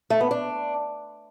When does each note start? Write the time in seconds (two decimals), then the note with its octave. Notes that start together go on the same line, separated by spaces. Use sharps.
0.10 A3
0.21 B3
0.31 D4